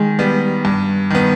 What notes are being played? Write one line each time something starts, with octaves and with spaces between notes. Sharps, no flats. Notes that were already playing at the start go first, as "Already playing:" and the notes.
Already playing: D#3 G#3
G3 B3
G2
D#3 B3